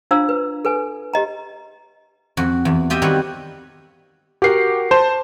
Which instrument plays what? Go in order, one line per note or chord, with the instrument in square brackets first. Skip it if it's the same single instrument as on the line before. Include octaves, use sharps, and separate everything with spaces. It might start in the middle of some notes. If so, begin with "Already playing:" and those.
[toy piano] D4 F4 C5 F5 A#5 E6
B4
A4 B4 G#5
G4 D#5 A#5
[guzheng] F2 F#4
E2
F4 G4 D#5 E5
D#3 G3 C4 F#4 B4 C#5
[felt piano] F#4 A#4 F#5 [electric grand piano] G4 C7
[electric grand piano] C5 E7 [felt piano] A5